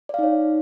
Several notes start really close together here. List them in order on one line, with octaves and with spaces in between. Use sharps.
D5 F5 D#4 C#5